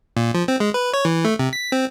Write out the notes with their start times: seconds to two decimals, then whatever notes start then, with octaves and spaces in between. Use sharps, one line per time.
0.17 A#2
0.35 F3
0.48 C4
0.60 G#3
0.74 B4
0.94 C#5
1.05 E3
1.25 A3
1.39 C3
1.53 B6
1.72 C4